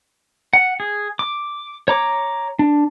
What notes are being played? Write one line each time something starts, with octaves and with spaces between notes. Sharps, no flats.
F#5
G#4
D6
C#5 A#5 D6
D4